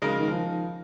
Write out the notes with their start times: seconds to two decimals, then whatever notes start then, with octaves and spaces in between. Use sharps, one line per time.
0.02 C#3 F#3 G#3 D#4 A#4
0.10 F3
0.20 D#3
0.28 F3